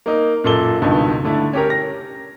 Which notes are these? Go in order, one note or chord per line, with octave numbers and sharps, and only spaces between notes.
A#3 D#4 A#4
F#2 A#2 A4 G7
C#2 G2 B2 D#3
D3 A3 E4
C#4 G4 A#4
A#6